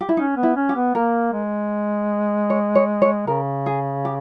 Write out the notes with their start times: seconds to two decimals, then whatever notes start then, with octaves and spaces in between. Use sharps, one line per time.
0.01 G4
0.09 E4
0.17 C#4 D#4
0.37 B3
0.43 E4
0.56 C#4
0.69 G4
0.76 B3
0.95 A#3 A#4
1.33 G#3
2.50 C#5
2.75 C#5
3.02 C#5
3.27 C#3 A#4
3.66 G#4
4.05 G4